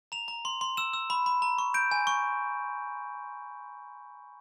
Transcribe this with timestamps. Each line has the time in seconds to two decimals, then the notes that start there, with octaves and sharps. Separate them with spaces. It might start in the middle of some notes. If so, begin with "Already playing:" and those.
0.12 A#5 F7
0.28 A#5
0.45 C6
0.61 C6
0.77 E6 E7
0.93 E6
1.10 B5
1.26 B5
1.42 A#5
1.58 C#6
1.74 G6 D7
1.91 G#5
2.07 C#6